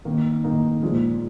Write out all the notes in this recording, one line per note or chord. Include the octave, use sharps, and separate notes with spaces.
D#3 A#3 D#4
D#3 A#3 D#4
A#2 F3 G#3